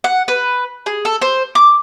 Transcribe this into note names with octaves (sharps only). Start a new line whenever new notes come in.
F#5
B4
G#4
A4
C5
D6